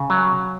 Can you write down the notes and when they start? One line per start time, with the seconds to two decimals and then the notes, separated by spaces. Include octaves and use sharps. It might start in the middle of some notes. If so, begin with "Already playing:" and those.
Already playing: C#3
0.10 F#3